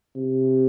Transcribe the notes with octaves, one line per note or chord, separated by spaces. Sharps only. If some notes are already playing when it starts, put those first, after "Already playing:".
C3